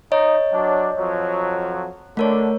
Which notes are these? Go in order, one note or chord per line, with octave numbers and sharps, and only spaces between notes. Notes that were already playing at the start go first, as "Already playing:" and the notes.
D#4 C#5 D#5
F#3 D4
F2 F3 F#3
D3 A3 A#4 C#5